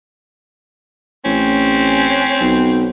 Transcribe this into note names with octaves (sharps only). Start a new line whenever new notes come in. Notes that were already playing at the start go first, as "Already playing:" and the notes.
A1 C4 C#4
B1